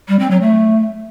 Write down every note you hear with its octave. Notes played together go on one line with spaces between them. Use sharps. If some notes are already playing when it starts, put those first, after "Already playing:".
G3
C4
F#3
A3